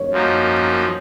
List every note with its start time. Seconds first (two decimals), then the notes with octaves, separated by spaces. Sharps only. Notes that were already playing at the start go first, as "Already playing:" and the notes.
Already playing: C#5
0.11 F#2 F3 A#3 D#4